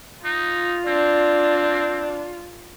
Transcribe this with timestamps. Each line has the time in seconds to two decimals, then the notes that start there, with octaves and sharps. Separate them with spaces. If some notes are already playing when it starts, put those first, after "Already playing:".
0.25 D#4 F4
0.87 C4 D4